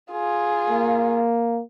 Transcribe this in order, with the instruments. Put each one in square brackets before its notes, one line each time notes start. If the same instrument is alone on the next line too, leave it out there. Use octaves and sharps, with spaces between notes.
[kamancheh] F4 G#4
[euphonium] A#3